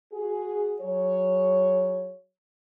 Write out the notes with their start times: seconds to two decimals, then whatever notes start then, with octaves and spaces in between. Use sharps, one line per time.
0.13 F#4 G#4
0.81 F#3 G#4 C#5